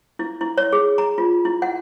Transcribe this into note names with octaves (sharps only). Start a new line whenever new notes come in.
E4
E4
C#5
G#4
A#5
F4
E4
F#5